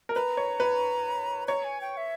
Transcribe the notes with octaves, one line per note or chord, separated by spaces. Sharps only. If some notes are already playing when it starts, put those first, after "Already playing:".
A#4
B4 A#5
C#5
B4
C#5 A#5
G#5
G5
E5